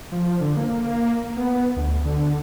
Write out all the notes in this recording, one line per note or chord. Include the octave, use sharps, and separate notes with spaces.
F3
D3
A#3
B3
D2
D3